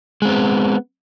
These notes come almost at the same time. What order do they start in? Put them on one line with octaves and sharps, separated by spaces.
G#3 C4 B3